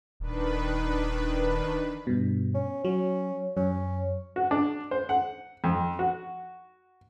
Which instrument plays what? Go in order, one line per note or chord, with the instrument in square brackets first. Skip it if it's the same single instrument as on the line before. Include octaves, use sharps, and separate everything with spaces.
[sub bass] D#1 [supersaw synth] D#3 D4 B4
[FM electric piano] G2 B2
[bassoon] C#4
[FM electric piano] F#3 [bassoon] C#4
[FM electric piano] F#2 [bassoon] C#4
[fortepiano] F#4
D4
C5
F#5
F2
F#4